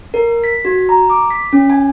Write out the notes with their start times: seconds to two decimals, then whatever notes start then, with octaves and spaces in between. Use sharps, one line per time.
0.14 A#4
0.44 B6
0.65 F#4
0.89 A#5
1.10 D6
1.30 B6
1.53 C#4
1.70 G#5